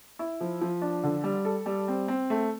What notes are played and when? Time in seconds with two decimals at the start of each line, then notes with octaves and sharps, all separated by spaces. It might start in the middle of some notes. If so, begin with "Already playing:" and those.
0.19 E4
0.41 F3
0.61 F3
0.82 D4
1.03 D3
1.24 G3
1.45 A4
1.66 G3
1.88 C4
2.08 C4
2.30 A3